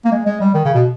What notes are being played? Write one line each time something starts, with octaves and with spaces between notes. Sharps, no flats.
A#3
G#3
G#3
G3
D#3
C#3
B2